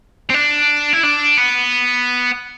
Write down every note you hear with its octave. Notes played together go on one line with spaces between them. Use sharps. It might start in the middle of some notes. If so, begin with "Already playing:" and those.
C4
D4
E4
D4
B3